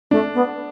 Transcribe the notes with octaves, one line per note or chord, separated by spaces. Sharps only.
A3 D4
B3